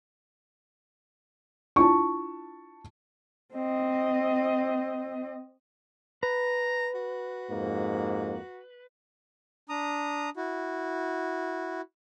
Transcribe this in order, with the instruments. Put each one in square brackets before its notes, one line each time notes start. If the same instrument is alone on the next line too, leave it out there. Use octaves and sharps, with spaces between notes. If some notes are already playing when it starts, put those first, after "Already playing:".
[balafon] D4 E4 F4 [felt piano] A5 C#6
[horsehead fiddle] C4 D#5
[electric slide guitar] B4 [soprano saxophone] A#5
[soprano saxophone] F#4
[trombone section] F2 G#2 A#3
[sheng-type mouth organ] D4 A#5 D#6
E4 F#4